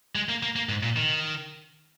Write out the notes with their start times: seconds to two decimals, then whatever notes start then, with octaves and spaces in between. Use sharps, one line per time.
0.15 G#3
0.29 A#3
0.43 A#3
0.56 A#3
0.69 G#2
0.83 A#2
0.97 D#3